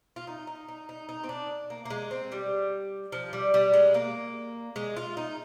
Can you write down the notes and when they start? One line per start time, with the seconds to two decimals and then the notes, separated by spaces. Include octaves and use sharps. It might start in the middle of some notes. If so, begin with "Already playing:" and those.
0.16 F4
0.27 D#4
0.47 D#4
0.68 D#4
0.89 D#4
1.09 D#4
1.24 C4
1.29 D4
1.70 A#3
1.85 A#3
1.90 G#3
2.11 C4
2.32 G3
3.12 F3
3.33 G3
3.54 G3
3.74 G#3
3.94 A#3
4.76 G#3
4.96 F4
5.17 D#4